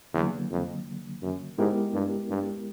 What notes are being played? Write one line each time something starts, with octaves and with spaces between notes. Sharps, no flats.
E2 D3 F#3 A#3
F2
F#2
G#2 G#3 B3 E4 G4 A#4
G2
G2